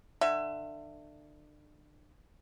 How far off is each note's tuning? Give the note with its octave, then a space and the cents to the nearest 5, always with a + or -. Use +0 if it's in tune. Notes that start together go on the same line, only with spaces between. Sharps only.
D3 +35 E5 +25